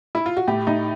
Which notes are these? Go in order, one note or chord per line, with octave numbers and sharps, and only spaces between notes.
E4
F4
F#4
A2 G4
A2 D#4